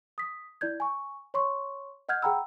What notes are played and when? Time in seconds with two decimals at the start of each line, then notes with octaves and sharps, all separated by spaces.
0.18 D#6 B6
0.61 E4 D5 G6 G#6
0.80 G#5 C#6
1.34 C#5 C6 C#6
2.09 D#5 F#5 F6 G6 G#6
2.22 G#4 F#5 G5 A#5 B5 E6